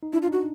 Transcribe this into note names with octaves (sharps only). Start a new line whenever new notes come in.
D#4
D4 E4
F4
D#4 F#4